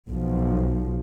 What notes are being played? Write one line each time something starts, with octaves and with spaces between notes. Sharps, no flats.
B1 F3